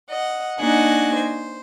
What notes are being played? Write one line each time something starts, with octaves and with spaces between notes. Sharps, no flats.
D#5 F#5
A#3 D4 D#4 F#4 F#5 G#5
C5